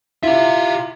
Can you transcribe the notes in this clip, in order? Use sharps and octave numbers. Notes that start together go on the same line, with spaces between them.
E4 F4 G4 E5